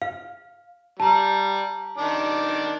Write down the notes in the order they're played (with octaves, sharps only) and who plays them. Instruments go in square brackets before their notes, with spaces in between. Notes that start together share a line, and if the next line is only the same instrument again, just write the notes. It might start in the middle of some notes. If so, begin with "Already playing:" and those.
[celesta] F5
[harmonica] G3 [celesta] A5 A#5
[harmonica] D#3 D4 D6